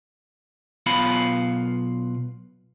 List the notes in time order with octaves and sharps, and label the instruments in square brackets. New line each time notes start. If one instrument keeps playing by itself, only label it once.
[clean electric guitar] B1 B3 F4 F5 B5